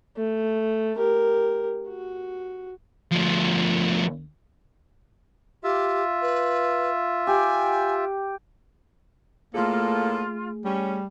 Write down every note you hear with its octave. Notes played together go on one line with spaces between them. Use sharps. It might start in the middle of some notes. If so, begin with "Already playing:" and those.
A3
G4 A#4
F#4
D2 F3
F4 G4 E5
B4
G4 G#5
A2 A3 A#3 F4 G#4 A4
G3 C#4